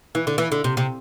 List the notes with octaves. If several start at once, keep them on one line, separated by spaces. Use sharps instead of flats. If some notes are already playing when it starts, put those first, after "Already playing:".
E3
D3
E3
D3
C3
C3